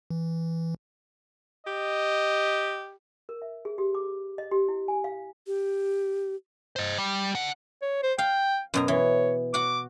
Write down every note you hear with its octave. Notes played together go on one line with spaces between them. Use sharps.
E3
G4 D#5
A#4
E5
G#4
G4
D6
D#5
G4
E4
G#5
F5
G4
C5 D#5
G3
D3 F#5
C#5
C5
F5 G5
F#2 B2 A#5
E3 C#5
F#4 F#5 D6